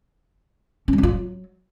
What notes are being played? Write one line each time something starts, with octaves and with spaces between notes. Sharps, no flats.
C#4
G3
C4
F4
F#3